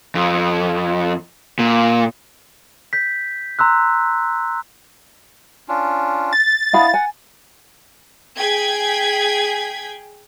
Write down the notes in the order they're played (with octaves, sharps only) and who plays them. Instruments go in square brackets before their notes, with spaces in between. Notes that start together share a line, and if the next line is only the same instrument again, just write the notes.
[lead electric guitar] F2
A#2
[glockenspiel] G6 B6
A#5 C6 E6 F#6
[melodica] C#4 D4 F4
[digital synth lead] A6
[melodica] B3 D4 D#5 [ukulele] E4 F5 B5
[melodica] F#5 [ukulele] G#5
[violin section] G#4 G5 G#6 B6